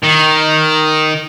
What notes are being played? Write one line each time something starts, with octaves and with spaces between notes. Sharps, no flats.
D#3